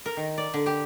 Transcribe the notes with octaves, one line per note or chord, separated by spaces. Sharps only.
A#4
D#3
D5
D3
G4